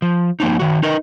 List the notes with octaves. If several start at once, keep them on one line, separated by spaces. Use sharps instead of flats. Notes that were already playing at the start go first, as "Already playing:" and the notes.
F3
F3 A#3 C4 D#4
D#3 F#4
D#4 A#4 B4 D#5